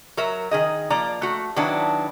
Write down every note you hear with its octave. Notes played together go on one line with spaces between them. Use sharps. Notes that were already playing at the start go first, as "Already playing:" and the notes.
F#3 A#4 E5
D#3 G#4 D#5
F3 A#3 D5 A#5
A3 F#4
D#3 F#3 B3 D4 E4